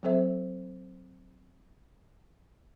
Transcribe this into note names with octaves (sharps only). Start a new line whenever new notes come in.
F#3 C4 A4 C5 E5